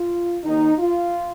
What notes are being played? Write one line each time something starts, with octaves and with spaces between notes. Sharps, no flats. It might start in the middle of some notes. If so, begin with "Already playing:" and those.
Already playing: F4
D#2 D#3 D#4
F4